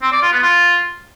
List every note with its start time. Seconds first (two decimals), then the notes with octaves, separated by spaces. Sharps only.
0.02 C4
0.12 D5
0.22 F4
0.32 B3
0.42 F4